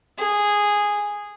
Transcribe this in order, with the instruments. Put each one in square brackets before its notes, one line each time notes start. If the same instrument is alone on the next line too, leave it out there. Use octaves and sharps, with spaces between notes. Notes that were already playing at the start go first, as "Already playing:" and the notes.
[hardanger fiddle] G#4